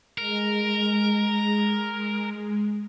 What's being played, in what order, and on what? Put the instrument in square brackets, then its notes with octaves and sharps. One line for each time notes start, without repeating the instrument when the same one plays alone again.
[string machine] G#3 [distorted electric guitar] A#4